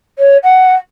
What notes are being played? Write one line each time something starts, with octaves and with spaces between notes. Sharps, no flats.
C#5
F#5